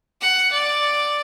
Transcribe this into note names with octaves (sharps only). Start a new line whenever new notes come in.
F#5
D5